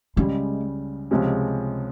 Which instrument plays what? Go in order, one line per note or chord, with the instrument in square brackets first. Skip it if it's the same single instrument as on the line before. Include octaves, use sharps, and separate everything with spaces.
[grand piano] C#2 C#3 G3 [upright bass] G#3
[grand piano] C#2 C3 F3 G#3 C#4